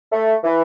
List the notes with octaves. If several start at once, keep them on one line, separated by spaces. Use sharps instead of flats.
A3
E3